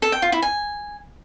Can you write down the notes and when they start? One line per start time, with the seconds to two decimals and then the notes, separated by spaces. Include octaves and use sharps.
0.02 A4
0.12 G5
0.22 F4
0.32 E4
0.42 G#5